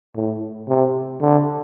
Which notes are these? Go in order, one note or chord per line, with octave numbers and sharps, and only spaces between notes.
A2
C3
D3